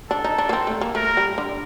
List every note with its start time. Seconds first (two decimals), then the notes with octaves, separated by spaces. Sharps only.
0.10 D4 A4
0.24 D#4
0.38 D4
0.49 A#3
0.53 C4
0.67 A3
0.81 A#3
0.95 A3 A#4
1.17 G3
1.38 D3